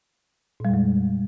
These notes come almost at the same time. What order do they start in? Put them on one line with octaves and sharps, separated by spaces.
A#2 G3 F2 G#3